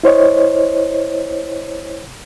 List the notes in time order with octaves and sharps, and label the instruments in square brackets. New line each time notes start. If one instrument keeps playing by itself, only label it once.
[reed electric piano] E4 C5 C#5 D#5